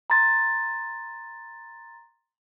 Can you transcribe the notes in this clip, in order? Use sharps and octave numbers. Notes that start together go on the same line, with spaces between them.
A#5 C6 A6